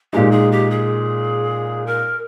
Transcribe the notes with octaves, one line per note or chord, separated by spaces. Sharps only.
A#2 G#3 D#4 G4
G#4
G4
G#4
A#4